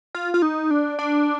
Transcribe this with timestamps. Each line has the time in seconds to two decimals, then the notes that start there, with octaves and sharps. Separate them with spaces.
0.15 F4
0.34 F4
0.42 D#4
0.71 D4
0.99 D4